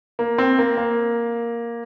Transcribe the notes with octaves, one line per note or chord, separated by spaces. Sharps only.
A#3
C4
A#3
A#3